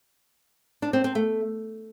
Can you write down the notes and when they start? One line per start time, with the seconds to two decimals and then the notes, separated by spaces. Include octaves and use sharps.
0.82 D4
0.93 C4
1.04 C4
1.15 A3